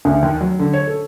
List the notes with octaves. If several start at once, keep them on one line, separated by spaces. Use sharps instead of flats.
D2
D#2
F#3
D3
C#5
A4